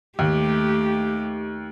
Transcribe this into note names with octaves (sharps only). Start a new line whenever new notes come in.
D#2 A3 G4